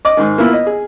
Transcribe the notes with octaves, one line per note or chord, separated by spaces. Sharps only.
D#5 D6
G#2 D#3
A#3 B3 E4 F4
D#5
G#4